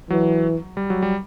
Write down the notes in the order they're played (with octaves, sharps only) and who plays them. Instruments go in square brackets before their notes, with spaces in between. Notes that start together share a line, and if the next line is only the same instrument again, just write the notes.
[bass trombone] E3 [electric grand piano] F#3
[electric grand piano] G3
F#3
G3